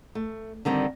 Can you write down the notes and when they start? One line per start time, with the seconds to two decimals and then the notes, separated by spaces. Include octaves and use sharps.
0.15 A3
0.65 D3 D#3 G3 C4